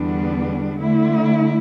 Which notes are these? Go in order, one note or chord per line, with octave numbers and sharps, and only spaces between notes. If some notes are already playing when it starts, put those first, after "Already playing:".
Already playing: E2 D3 G3 B3 D4
D3 A3 E4